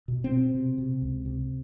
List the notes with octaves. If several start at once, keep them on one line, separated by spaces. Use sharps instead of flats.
B2
C4
B2
C3
C3
C#2
C3